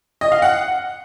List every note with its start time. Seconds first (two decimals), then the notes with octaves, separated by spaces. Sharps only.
0.21 D#5
0.32 F5
0.42 F#5